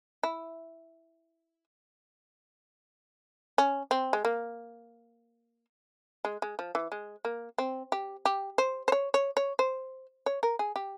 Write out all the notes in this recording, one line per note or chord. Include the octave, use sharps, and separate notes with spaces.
E4
C#4
C4
G#3
A#3
G#3
G#3
F3
E3
G#3
A#3
C4
G4
G4
C5
C5
C#5
C#5
C#5
C5
C#5
A#4
G#4
G4